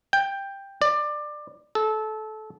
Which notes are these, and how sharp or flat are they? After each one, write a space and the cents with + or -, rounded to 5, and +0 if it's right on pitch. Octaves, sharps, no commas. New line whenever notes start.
G5 +10
D5 +20
A4 -20